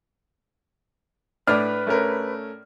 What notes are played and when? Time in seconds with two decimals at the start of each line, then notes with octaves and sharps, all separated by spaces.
1.47 A2 D4 B4 F6
1.87 A3 C#4 A#4